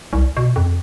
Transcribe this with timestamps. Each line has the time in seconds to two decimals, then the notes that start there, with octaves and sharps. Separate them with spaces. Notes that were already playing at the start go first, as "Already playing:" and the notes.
0.13 C2
0.37 B2
0.56 F2